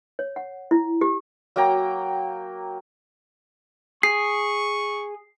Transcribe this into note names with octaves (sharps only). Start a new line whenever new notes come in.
C#5
F#5
E4
G4
F#3 A#3 G5 A#5
G#4 C#6 C7